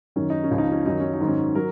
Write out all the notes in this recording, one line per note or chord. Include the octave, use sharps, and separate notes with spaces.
F#2 D#3 F#3 C#4
D#4
C#4
C#2 C#3 F3
D#4
C#4
F#2 D#3 F#3 D#4
C#4
D#4
G#2 D#3 F#3
C#4
F#3 A#4